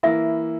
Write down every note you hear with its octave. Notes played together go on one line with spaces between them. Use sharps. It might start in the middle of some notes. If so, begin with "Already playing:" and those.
E3 A#3 E4 E5